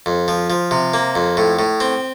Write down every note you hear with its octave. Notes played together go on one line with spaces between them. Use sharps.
F2
F3
F3
C3
A#3
F2
A2
A2
C4